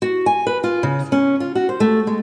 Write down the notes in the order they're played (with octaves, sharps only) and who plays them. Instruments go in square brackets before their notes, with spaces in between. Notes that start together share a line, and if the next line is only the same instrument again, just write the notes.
[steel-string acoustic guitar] F#4
G#5
B4
F4
C#3
C#4
F4
F#4
C5
A3
G#3